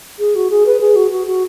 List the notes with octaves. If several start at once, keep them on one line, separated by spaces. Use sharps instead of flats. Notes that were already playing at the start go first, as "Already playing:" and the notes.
G#4
F#4
G#4
B4
G#4
F#4
F#4
F#4